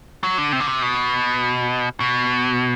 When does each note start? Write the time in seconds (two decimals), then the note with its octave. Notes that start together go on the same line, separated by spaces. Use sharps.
0.23 F#3
0.38 D3
0.53 C3
0.60 D3
0.67 C3
0.82 B2
2.00 B2